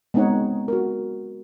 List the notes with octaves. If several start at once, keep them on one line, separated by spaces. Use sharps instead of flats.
G#3 B3 C4 D#4 C#5 F#5
F#4 A#4